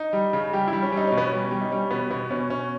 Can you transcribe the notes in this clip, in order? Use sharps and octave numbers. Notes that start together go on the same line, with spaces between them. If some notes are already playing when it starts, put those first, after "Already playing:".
Already playing: D#4
G3
C#3
G3 G4
E4
G3
C#4
G3 D#4
B2 C#4
B3
G3 C#4
G3
D#4
G3 C#4
B2 B3
B2 B3
B2 C#4
B2 C#4